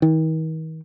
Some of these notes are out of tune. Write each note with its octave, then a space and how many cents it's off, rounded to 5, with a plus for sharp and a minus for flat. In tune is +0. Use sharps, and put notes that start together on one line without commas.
D#3 +40